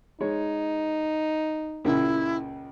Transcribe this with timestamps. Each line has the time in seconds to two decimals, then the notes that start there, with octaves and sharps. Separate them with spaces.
0.20 G#3 D#4 C#5
1.85 C#2 A#2 C#3 E4